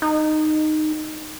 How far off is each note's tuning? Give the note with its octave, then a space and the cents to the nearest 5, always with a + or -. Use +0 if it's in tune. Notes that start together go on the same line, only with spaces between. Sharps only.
D#4 -10